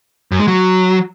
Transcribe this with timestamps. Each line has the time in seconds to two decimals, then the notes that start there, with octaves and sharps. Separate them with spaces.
0.31 F#2
0.40 G#3
0.48 F#3